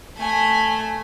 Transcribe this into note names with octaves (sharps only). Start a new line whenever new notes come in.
A3 G#5